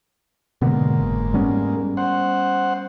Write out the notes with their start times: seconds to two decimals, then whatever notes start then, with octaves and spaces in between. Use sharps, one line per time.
0.62 G#2 B2 D3 A#3 B3
0.99 F#1
1.34 G3 B3 C#4
1.97 C5 F#5